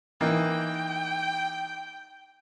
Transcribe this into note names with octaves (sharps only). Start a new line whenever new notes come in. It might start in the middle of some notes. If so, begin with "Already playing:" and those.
E3 A#3 D#4 G5